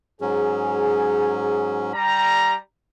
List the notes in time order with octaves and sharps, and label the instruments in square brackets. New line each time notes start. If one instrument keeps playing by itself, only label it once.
[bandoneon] G#2 F#3 C#4 [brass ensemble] G#4
[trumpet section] G3 A#5